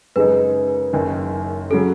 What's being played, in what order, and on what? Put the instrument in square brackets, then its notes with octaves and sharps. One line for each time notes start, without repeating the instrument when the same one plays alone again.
[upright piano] F#2 C#3 G#3 D#4 [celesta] B4
[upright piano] F#1 F#2 D#3
[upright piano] C#3 F#3 [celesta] A4